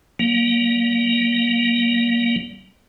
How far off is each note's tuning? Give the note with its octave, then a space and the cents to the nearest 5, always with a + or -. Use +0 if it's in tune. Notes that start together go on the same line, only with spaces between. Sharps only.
G3 -40 A#3 +20